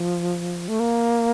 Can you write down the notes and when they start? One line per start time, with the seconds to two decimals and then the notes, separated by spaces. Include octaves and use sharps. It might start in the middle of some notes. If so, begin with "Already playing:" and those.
Already playing: F3
0.68 A3
0.80 A#3